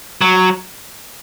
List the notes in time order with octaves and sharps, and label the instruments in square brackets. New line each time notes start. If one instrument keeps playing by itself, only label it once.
[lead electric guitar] F#3